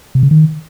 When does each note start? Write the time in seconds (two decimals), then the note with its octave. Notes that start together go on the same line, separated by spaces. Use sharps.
0.15 C3
0.23 C#3
0.31 D#3